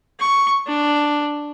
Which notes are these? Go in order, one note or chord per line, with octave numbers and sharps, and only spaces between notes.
C#6
D4